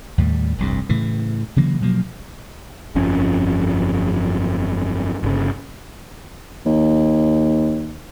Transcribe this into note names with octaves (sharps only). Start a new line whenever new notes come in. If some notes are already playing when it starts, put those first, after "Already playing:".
D#2 A2 G3
F1 C2 G2
A2 C#3 E3
C#3 E3 F#3 A#3
B2 F3 F#3 A#3
G1 F2 F3 C#4
G1 C#3
D#2